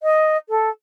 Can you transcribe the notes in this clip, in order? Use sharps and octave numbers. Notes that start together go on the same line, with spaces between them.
D#5
A4